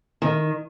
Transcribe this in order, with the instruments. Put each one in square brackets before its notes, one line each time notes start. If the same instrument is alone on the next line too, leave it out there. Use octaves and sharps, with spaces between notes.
[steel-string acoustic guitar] D#3